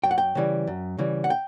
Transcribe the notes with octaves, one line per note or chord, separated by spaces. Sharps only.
F#2 G5
F#5
G5
C#3 E3 G3
F#2
C#3 E3 G3
F#5
G5